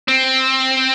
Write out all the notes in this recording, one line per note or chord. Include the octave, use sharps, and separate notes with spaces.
C4